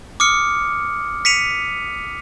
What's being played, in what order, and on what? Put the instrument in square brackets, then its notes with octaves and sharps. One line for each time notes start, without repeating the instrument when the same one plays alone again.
[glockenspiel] D6 D#6 F6 C#7
B6 C#7 D#7 F7